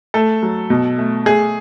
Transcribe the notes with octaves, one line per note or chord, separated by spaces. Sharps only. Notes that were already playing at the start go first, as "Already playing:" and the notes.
A3 A4
F#3
B2
A3
A3 G#4